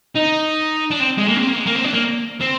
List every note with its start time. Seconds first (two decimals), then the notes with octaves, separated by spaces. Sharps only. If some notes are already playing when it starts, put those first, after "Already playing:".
0.15 D#4
0.91 D4
1.00 C4
1.18 G#3
1.28 A#3
1.37 C4
1.47 A#3
1.56 G#3
1.66 A#3
1.75 C4
1.84 D4
1.94 A#3
2.41 C4